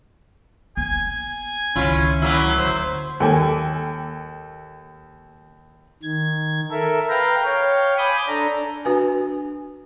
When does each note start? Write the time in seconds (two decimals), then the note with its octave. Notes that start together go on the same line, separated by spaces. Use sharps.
0.77 B3 G#5
1.76 C#2 D#3 C#4 E4 F4
2.22 F#3 A#3 E4
2.58 D2 C5
3.20 D#2 A#3 A4 G5 G#5
6.03 D#3 G#6
6.71 A4 A#4 E5
7.09 B4 F5 G5 A#5
7.44 C#5 F5 G5
7.98 G#5 B5 D6 D#6 G6
8.28 D4 A4 A#5
8.85 D4 F#4 B4 G#5